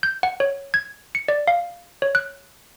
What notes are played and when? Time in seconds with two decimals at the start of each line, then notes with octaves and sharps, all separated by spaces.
0.03 G6
0.23 F#5
0.40 C#5
0.74 G#6
1.15 C#7
1.28 D5
1.48 F5
2.02 C#5
2.15 F#6